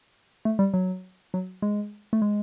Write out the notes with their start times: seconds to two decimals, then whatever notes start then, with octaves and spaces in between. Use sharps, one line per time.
0.45 A3
0.59 G3
0.74 F#3
1.34 F#3
1.62 G#3
2.13 A3
2.22 G#3